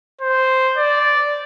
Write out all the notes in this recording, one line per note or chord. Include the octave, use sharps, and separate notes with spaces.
C5
D5